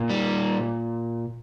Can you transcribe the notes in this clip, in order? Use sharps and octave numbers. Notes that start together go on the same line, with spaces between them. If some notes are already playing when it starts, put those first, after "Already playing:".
Already playing: A#2
G3